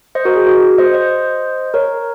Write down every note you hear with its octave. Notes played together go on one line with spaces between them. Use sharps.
C5 D#5
F#4 A#4
G#4
F#4
C5 D#5
C5 D#5
A#4 C#5